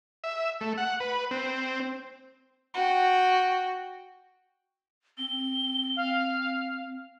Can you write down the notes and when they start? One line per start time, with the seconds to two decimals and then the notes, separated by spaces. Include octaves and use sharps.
0.24 E5
0.61 A3
0.78 F#5
1.00 B4
1.31 C4
2.74 F#4 G5
5.18 C4 G7
5.97 F5